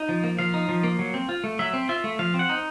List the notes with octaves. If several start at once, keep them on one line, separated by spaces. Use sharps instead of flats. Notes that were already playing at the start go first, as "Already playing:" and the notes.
Already playing: D#4
F3
A#3
F3 F5
D#4
F3
A#3
F#3
C4
F4
A3
F#3 E5
C4
F4 E5
A3
F3 F5
C4
F#5
D#4